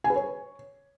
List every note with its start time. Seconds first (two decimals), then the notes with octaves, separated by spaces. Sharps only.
0.04 G#5
0.10 B4
0.16 C#5